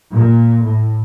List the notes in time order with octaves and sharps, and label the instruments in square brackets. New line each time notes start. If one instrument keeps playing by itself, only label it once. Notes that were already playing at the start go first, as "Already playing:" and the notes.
[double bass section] A#2
A2